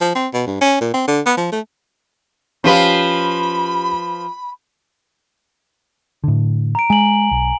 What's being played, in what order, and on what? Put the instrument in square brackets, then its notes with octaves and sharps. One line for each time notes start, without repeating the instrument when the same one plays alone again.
[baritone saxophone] F3
C4
B2
G2
C#4
A#2
C4
D3
B3
F3
A3
[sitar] F3 F4 B4 [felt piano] C#4 G4 F5 [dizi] B5
[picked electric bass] A2 D3
[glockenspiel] A#5 D7
[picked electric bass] G#3 [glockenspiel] G#5 F#7
[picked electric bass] B1